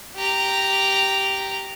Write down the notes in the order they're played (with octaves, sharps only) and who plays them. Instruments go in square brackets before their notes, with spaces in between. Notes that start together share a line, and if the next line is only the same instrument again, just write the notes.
[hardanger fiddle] G4 A#5